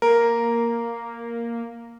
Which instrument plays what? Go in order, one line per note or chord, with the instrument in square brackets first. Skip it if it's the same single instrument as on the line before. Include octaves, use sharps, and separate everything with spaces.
[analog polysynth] A#3 [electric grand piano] A#4